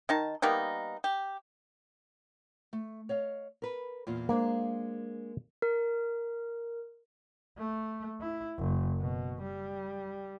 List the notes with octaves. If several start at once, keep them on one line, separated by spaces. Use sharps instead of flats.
D#3 D#4 A5
G3 A#3 B3 D#4
G4
A3
C#5 D#5 F5
A#4 B4
E2 A#2 F4
G#3 A#3 D4 C5
A#4
A3
E4
F#1
B2
G3